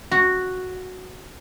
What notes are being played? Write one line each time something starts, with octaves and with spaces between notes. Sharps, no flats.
F#4